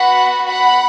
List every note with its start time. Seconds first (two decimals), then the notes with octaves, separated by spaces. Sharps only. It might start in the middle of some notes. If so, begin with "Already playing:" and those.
Already playing: B3 F#4 F#5 B5
0.48 F#5 B5